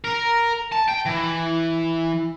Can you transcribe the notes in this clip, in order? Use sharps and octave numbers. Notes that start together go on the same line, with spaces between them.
A#4
A5
G5
E3